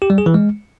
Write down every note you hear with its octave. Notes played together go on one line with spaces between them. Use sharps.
G4
G3
G#4
E3
G#3